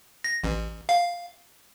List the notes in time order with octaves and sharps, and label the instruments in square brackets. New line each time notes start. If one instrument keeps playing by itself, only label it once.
[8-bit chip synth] A#6
A1
F5